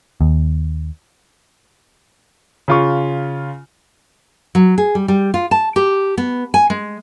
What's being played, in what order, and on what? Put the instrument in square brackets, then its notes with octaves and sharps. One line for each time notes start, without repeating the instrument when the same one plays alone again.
[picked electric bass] D#2
[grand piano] C#3 F4 C#6
[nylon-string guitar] F#3
G#4
G3
G3
F4
A5
G4
B3
G#5
G#3